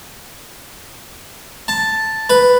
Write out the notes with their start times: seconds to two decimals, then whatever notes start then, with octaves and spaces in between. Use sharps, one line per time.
1.68 A5
2.30 B4